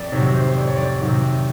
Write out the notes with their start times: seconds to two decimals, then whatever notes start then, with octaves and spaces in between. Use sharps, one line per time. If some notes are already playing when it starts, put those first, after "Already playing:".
Already playing: F2 D5
0.12 C3 D#3 F#3 C#5
0.34 C5
0.57 F2 D5
0.67 C#5
0.77 D5
1.00 C3 D#3 F#3